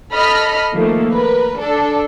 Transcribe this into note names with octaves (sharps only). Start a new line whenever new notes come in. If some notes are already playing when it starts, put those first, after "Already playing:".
A4 D#5 B5 F6
D#3 F3 A3 A#3
A#4 B4
D4 A4